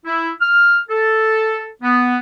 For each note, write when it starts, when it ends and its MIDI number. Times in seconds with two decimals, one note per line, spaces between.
0.06 0.31 64
0.41 0.80 89
0.89 1.69 69
1.83 2.17 59